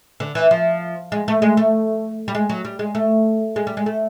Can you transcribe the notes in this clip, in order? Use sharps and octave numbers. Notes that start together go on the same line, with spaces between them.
D3
E3
F3
G#3
A3
G#3
A3
G3
G#3
F#3
G3
G#3
A3
G#3
G3
G#3
A3